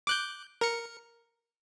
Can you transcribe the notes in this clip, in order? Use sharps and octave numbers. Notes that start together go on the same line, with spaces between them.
D6 F#6 G6
A#4 C#7